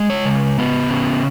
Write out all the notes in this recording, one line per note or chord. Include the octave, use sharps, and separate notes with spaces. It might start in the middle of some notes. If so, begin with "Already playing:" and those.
Already playing: G#3
C#5
C#3
B3
C#3